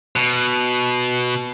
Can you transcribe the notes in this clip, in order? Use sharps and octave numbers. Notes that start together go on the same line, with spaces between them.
B2